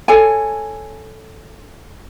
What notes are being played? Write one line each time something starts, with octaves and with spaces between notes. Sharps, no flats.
A4 C#5 G#5